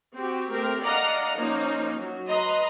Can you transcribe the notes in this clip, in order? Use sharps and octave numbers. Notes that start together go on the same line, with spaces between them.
C4 F#4 G4
A3 C4 G4 A#4
D4 D5 D#5 F5 F#5 A#5
F3 A#3 C#4 D#4
F#3
B4 D#5 A#5 C6